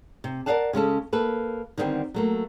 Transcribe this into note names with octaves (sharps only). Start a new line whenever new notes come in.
C3
A#4 D5 D#5 F5 F#5 A5
C#3 G#3 C#4 A4
A#3 A4 B4
D3 D#3 G3 A3 B3 C4
F#3 A3 A#3